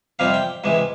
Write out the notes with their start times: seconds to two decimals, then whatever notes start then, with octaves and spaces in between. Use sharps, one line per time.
0.19 F2 C3 G3 C4 F5
0.34 G5
0.64 C#2 C3 E3 G#3